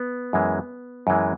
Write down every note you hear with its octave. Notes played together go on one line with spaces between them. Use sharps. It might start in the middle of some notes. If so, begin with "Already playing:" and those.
Already playing: B3
F#2 E3 G#3
F#2 E3 G#3